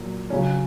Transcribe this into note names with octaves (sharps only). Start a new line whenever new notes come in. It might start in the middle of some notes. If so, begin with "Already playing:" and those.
Already playing: A#2 F#3
C#3 F#3 C#4